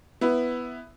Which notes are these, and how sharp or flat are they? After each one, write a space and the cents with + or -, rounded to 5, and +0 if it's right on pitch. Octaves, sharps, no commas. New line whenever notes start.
B3 +5 E4 +0